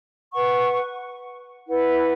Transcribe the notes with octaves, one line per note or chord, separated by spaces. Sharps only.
B4 F#5 C#6
E4 B4 F#5